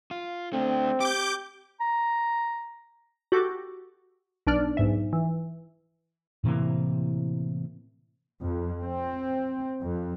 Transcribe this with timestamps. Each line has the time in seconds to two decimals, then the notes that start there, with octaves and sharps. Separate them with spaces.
0.11 F4
0.53 A3 C4 D4
1.00 G4 D6 G6
1.80 A#5
3.32 F#4 G4 A4 D6
4.47 B1 D4 D5 F6
4.77 B1 G#2 E5
5.13 E3
6.44 A2 C3 E3 A#3
8.41 F2
8.82 C4
9.81 F2